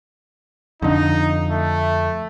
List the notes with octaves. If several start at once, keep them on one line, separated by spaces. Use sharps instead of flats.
F2 D3 D#4
A3